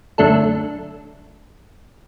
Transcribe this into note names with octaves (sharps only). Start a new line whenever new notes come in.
F#2 D3 A3 D4 A4